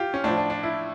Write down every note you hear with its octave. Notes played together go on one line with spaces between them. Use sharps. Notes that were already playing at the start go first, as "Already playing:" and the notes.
Already playing: F4 G4
C#4
A2 F3 D4
D4
D4
E4